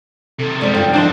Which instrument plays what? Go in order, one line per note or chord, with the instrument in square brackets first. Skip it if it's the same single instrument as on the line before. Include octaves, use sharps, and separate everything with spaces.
[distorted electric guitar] C3 D#3 [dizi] A4
[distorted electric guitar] D#3 G3 [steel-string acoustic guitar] G#3 C4 C5 [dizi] D5
[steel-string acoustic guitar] G2 F4 [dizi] G5
[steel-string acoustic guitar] F#2 F3 B4 [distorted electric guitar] C4 C6 [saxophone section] D4 [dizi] D#4